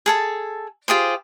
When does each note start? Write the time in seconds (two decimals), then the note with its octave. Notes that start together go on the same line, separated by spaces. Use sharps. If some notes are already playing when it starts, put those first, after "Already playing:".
0.06 G#4 A4 A5
0.88 F4 G4 G#4 C5